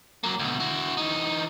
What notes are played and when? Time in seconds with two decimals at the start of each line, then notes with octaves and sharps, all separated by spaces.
0.24 F#3 A#3
0.39 D2 B2
0.60 E4 F#4
0.97 E3 D#4